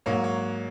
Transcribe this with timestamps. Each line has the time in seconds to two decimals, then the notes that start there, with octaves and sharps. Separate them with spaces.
0.06 G#2 F#3 A#3 C#5
0.24 C#5